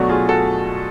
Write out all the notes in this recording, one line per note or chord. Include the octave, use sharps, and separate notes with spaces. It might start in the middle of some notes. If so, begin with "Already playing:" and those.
Already playing: B2 F#3 A3 D4 F#4
F4 G#4
F#4 A4